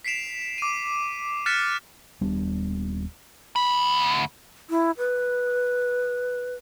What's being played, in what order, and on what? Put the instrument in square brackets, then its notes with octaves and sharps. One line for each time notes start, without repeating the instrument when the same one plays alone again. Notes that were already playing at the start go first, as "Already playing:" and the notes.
[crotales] B6 C7 D7 E7 F7
D6 D#7
F6 F#6 A6 B6 C#7 E7
[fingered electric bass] D#1 G3 B3 D4
[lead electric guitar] D2 B5
[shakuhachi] E4
B4